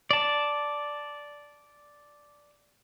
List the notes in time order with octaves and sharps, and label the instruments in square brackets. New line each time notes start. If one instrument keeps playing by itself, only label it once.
[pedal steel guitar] D5 A5